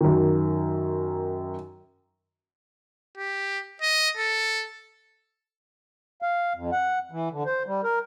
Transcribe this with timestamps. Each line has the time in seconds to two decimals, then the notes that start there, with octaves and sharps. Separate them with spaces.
0.01 F#2 D#3
3.18 G4
3.82 D#5
4.17 A4
6.22 F5
6.55 F2
6.72 F#5
7.12 E3
7.31 D3
7.46 C5
7.67 G3
7.84 A#4